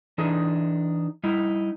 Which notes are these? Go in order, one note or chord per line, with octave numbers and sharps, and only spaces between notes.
E3 D4 D#4 G#4
G3 D#4 E4